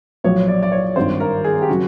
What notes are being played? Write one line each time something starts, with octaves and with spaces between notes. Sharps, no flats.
B1 A#2 F3 C#5
D5
D5
C#5
G#1 G2 D#3 C5
A#4
G#4
G4
C#3 F#3 F#4